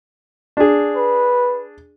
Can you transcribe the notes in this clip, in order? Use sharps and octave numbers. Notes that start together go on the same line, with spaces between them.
D4 G#4
B4